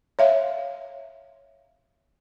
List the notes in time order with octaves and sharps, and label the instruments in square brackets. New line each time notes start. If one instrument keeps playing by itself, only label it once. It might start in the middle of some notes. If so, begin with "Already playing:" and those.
[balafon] C#5 E5 F5